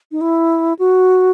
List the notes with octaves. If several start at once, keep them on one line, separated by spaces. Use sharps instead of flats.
D#4
E4
F#4